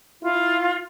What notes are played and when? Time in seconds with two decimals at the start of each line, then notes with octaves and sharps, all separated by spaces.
0.23 E4 F4